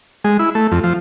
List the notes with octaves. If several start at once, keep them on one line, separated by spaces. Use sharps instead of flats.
G#3
E4
A3
F2
F3